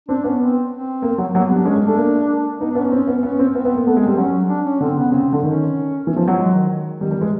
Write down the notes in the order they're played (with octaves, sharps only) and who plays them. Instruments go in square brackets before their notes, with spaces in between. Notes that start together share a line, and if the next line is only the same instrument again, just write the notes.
[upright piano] C4 [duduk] D4
[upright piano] B3 [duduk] C#4
[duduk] C4
C4
[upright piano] A#3
F#3
[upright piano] F#3 [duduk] A#3
[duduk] B3
[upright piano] G3
[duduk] D4
[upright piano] G#3 [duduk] C#4
[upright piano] G#3
[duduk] D4
[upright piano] A3
A#3
[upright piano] B3 [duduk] D#4
[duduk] D4
[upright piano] B3
[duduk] C#4
[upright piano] C4
B3
[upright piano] B3 [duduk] C#4
[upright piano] C4
[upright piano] B3 [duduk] C4
[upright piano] B3
A#3
[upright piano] A3 [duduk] B3
[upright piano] G#3
[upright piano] G3 [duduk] C4
[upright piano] F#3 [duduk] C#4
[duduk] D4
C#4
[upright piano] D3 [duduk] C4
[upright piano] C#3 [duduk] B3
[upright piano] C#3 [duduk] C4
[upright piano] C#3
D3
[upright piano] D#3 [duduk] C#4
[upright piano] E3
F3
F#3
[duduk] G#3
D#3
D#3
[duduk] D#3 [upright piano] G3
[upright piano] G3
[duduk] E3 [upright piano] G#3